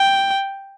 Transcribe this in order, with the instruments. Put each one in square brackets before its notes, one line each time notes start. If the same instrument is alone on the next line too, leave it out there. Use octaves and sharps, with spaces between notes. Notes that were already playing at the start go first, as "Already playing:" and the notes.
Already playing: [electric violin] G5